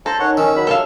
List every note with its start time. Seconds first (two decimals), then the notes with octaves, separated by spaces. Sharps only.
0.06 A4 C5 A5 A#5
0.20 D#3 C#4 D#4 C#5 F#5 C#6
0.37 D#3 C#4 E6
0.54 E2 F#3 B5
0.67 F#2 C3 A4 E5 F5